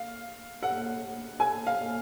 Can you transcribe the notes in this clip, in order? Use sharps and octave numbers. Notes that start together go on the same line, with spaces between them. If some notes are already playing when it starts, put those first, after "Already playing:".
Already playing: F5
F#5
G#5
F5